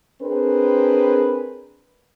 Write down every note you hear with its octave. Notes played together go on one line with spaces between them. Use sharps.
C4 D4 G#4 A#4 B4